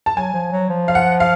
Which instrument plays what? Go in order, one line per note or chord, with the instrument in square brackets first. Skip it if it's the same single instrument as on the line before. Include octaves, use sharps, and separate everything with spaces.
[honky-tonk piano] A5
[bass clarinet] F#3 [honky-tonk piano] G#5
[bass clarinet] F3
F#3
F3
[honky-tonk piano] F5
F#5
F5